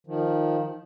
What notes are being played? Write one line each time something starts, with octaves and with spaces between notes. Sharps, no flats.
D#3 F3